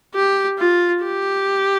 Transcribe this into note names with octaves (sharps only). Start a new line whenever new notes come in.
G4
F4
G4